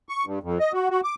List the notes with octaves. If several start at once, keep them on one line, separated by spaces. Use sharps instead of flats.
C#6
G2
F2
D#5
F#4
F#4
D6